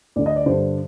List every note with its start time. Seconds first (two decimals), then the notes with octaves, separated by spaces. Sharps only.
0.16 D2 D3 D5
0.26 D#5
0.36 D5
0.46 G2 D3 C5